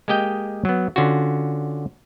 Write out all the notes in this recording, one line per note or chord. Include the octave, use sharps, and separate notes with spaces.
G#3 A#3 G4 D#5 G5
F#3 B3
D3 C#4 F4 F#4